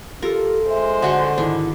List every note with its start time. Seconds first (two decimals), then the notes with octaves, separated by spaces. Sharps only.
0.23 F4 G4 A4 A#4
0.69 G#3 C5 E5
1.02 D3 F#4 C#6
1.38 G#1 D4 E4